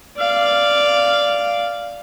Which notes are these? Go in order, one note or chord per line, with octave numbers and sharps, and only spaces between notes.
D5 F5